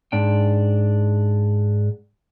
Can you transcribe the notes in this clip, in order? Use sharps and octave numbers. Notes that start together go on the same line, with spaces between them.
G#2 D4 G5